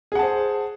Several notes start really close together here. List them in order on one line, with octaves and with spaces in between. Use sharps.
G#4 F#5 A5 C5